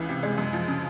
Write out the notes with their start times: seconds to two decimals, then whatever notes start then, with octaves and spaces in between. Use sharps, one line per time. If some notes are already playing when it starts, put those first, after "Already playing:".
Already playing: C#2 C#3 E3
0.09 C3
0.23 G#3
0.38 F#2
0.53 F3
0.68 C#3